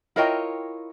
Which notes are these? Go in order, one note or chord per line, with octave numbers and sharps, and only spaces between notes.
E4 F4 A#4 C#5 D#5 G5